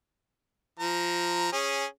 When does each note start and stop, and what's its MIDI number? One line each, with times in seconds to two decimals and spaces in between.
0.79 1.48 53
0.79 1.48 82
1.53 1.85 61
1.53 1.85 68